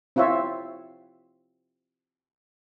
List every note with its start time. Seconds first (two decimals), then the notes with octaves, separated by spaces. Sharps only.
0.16 C4 E4 F4 C#5 E5